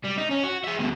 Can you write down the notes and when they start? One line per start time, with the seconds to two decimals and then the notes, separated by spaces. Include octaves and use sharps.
0.05 G3
0.18 D#4
0.31 C#4
0.44 F#4
0.64 G#4 E5
0.79 D2 B2